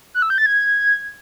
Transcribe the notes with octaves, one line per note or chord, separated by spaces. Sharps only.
F#6
E6
G6
A6
G#6